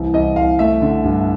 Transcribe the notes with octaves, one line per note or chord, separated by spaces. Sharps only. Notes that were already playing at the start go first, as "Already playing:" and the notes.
Already playing: C2 E3
C2 D#5
C2 F5
A3 E5
D3
G2